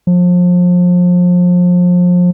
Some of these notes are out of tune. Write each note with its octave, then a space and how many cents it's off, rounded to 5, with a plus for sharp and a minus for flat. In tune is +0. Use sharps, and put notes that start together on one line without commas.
F3 +30